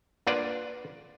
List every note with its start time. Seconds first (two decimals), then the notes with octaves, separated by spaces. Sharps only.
0.27 A#3 D4 F4 B4 D5 F#5